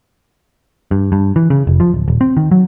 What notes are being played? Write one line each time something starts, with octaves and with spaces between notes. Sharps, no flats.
G2
G2
E3
C#3
F1
F3
D1
D#1
C4
D#3
F#3